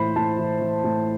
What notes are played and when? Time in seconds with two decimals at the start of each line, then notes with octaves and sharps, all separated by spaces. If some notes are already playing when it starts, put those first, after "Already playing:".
Already playing: A2 E3 C5 B5
0.16 A2 A5
0.39 E3
0.61 E3
0.84 A2